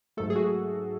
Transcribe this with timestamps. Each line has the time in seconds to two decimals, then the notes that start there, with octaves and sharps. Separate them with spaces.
0.17 G#2 F#3 A3 A4
0.30 G#4
0.36 F#4